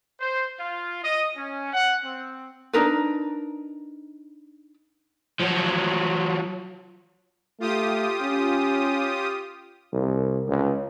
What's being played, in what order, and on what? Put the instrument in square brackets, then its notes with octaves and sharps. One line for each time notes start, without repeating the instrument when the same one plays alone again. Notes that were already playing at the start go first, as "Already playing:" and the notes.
[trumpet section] C5
F4
D#5
C#4
F#5
C4
[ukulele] D4 D#4 A#4 B4
[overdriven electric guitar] F3 F#3
[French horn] A3 [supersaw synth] F4 G4 D#6
[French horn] C#4
[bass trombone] C2
C#2